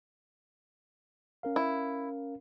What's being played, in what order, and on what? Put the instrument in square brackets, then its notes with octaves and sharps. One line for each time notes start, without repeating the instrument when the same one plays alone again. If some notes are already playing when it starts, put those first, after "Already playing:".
[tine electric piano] C#4 A#4 F5
[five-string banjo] E4